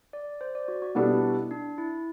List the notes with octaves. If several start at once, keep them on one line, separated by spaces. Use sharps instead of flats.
D5
C5
D5
F#4
F#4
B2 G3 B3 D4 E4 A4
D4
E4